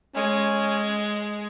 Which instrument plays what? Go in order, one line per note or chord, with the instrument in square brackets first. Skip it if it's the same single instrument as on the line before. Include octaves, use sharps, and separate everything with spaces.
[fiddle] G#3 [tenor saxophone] C#4